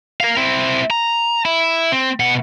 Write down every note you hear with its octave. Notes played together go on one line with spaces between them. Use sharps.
A#4 F5
C4 E4
A#5
E4
C4
B2 F#5